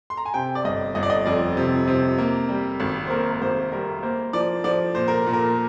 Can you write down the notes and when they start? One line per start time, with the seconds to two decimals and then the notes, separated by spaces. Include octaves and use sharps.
0.10 C6
0.17 A#5
0.26 G#5
0.34 C3 G5
0.55 D5
0.64 G1 D#5
0.95 G1 D#5
1.03 D5
1.10 D#5
1.26 F2 D5
1.57 C3
1.88 C3
2.18 A#3
2.49 G3
2.80 G#1
3.06 C5
3.10 A#3 A#4
3.30 A#4
3.41 G#1 C5
3.72 G3 A#4
4.03 A#3 C5
4.33 F3 D5
4.64 F3 D5
4.95 A#2 C5
5.08 A#4
5.26 A#2
5.33 A#4